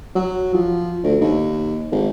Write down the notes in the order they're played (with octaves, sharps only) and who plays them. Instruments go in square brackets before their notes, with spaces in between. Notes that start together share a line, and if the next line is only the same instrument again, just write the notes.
[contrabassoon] F#3
F3
D2
D#2
G#1